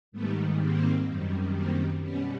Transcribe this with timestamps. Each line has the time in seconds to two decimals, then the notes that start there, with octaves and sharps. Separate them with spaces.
0.12 G#2 D#3 G3 A3 B3
0.59 A#3 C4
1.07 F#2 D#3 G3
1.54 A#3 C4
2.02 B2 G3 B3 C#4